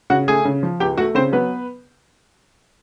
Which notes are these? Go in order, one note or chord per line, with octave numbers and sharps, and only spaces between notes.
C#3 F#4 F#5
A3 G#4 G#5
C#3
F3
C#2 G4 G5
A3 F#4 F#5
C#3 C4 C5
F#3 B3 B4